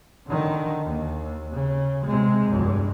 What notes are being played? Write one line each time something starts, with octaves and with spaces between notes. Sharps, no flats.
D3 D#3
D#2
C#3
C3 G#3
G2